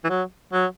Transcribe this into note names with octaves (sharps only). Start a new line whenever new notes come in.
E3
F#3
F#3